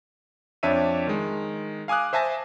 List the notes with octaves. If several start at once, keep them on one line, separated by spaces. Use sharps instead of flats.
F2 D4 C#5 E5 D#7
D#3 G#3
F5 G#5 D6 D#6 F#6
C5 E5 G#5 A5 A#6